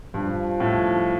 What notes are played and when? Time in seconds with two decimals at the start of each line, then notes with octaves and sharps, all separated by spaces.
0.14 G2 F3
0.60 A2